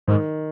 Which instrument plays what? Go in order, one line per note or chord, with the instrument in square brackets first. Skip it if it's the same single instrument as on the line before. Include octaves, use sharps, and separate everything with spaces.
[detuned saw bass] G#2 [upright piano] D#3